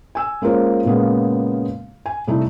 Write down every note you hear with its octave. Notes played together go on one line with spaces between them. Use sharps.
G#5 E6
G#3 A#3 C#4 F4 A#4 C5
A#2 C#3 G#3 A#3 B3
G#5
C3 G3 A3 D#4 E4